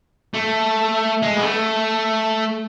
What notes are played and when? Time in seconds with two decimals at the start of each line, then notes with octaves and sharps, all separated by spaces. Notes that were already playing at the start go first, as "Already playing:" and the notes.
0.34 A3
1.22 G#3
1.36 B3
1.44 A3